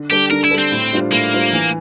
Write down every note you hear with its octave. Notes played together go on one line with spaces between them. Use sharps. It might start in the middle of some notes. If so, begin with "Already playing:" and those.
Already playing: D3
G3 D4 G4 A4
D3 A#4
E4
G3 D4 A4
C4
A2
G3 D4 F4 C5
A2 A#3
G3 D4 F4 C5
E3